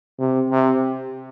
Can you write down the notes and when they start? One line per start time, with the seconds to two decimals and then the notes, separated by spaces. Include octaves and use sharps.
0.19 C3
0.50 C3